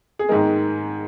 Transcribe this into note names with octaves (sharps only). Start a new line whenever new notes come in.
G#4
G#2 D#3 G#3 A#4